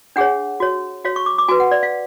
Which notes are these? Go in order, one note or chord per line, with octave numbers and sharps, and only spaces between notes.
D4 G#4 C#5 F#5
F#4 C#5
F#4 C#5 F5
C#6
D6
D6
F#4 B4 G#5
F#5
D5
F5